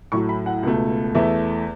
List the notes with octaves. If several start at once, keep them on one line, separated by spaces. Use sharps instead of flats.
A2 F#3 A3 C#6
B5
F#5
C#2 B2 A3
E2 E3 A3 E5